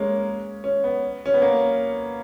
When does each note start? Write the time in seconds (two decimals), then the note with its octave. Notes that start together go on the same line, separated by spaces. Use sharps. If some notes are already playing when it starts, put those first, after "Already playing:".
Already playing: G#3 A#3 C#4
0.64 C#4
0.84 B3
1.26 C#4
1.34 B3
1.42 A#3